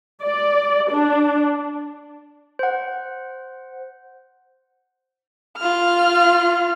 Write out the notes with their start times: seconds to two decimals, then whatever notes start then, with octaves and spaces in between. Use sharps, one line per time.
0.23 D5
0.91 D4
2.59 C5 F#5
5.58 F4 F6